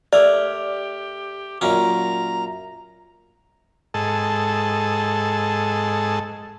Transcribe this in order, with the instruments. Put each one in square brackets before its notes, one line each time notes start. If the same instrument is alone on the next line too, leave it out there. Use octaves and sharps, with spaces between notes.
[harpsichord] A3 A#4 [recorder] G4 [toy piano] D5
[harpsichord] F#2 A#2 C#4 [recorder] A#5
[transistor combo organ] G#2 G#4 A4 D#5 A5 E6